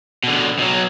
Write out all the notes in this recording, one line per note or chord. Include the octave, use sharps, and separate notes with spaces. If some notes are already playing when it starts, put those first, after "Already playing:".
B2 D3
B2 F#3